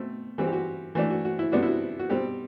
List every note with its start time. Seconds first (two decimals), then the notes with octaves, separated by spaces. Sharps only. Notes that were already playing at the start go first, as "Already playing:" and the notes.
Already playing: B2 A3 C4
0.38 E3 G3 C4 F#4
0.47 G4
0.53 F#4
0.95 E3 A3 D4 F#4
1.10 F#4
1.25 F#4
1.39 E4
1.52 C3 G3 B3 D4 F#4
1.63 E4
1.67 F#4
1.99 F#4
2.10 B2 G3 C4 G4